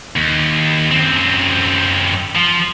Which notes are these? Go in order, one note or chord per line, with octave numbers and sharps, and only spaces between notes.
D#2
F#2 C4
F3